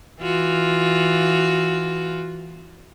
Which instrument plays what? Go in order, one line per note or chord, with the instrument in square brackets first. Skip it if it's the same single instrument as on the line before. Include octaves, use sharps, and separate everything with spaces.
[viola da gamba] E3 F4 F#4